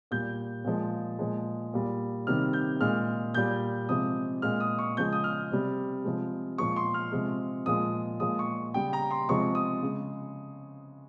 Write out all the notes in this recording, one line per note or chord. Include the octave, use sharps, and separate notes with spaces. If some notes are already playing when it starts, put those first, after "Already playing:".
A#2 G3 G6
A#2 F3 G#3
A#2 F3 G#3
A#2 G3
C3 D#3 G3 F6
G6
A#2 G#3 F6
A#2 G3 G6
C3 F3 G#3 D#6
A#2 G#3 F6
D#6
C#6
C#3 F3 G#3 G6
D#6
F6
C3 G3
C3 F3 G#3
A#2 F3 G#3 C#6
C6
F6
C3 F3 G#3
A#2 F3 G#3 D#6
A#2 F3 G#3 D#6
C#6
C#3 G3 G5
A#5
C6
C3 F3 G#3 C#6
D#6
C#3 G#3